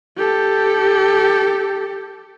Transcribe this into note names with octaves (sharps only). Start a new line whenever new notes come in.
G4 A4